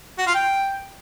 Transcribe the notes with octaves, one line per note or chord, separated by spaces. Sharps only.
F#4
F4
G5